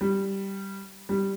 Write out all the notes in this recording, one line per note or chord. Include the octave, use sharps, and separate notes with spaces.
G3
G3